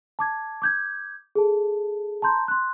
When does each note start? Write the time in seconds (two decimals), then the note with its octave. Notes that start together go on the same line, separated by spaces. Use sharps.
0.19 A5 D6 G#6
0.62 D6 G6 G#6
1.35 G#4 A4 A5
2.22 A5 A#5 C6 G6
2.48 C6 F#6